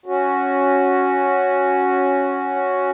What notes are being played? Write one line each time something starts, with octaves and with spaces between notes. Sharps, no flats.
C#4 F#4